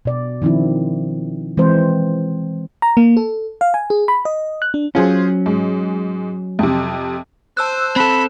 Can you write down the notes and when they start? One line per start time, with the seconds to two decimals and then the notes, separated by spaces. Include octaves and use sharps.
0.05 B2 D5
0.42 D#3 F3 C4 D4 E4
1.57 E3 G#3 C4 C5
2.82 A#5
2.97 A#3
3.17 A4
3.61 F5
3.74 G#5
3.90 G#4
4.08 B5
4.25 D#5
4.62 F#6
4.74 D4
4.95 F#3 C#4 F4 G#4 C5
5.46 G#2
6.59 F2 C3
7.57 C5 A5 E6 F#6
7.96 C4 A4 B5